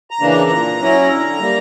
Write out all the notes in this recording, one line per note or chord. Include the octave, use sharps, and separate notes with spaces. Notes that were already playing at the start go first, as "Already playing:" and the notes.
A#5
C#3 E3 A#3 D4
A#5
A#2
F#3 C#4 E4
D3
G3 A#3